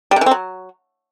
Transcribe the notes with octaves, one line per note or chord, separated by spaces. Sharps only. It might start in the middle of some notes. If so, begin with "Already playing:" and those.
G3
C3
E3
C4
F#3